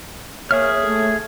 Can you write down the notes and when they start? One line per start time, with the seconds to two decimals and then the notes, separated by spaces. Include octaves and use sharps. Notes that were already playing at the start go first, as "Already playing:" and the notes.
0.51 A#3 G#4 C#5 E5 F6
0.84 A3